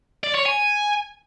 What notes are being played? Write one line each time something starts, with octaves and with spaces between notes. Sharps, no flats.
D5
C#5
G#5